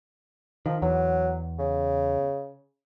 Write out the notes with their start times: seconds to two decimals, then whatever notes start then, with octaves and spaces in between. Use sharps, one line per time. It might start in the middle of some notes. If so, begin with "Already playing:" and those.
0.66 D#3 F3
0.82 E2 F#3
1.59 C#3